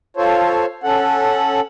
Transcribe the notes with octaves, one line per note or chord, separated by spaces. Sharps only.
F4 A4 C5 C#5
C#4 A4 F#5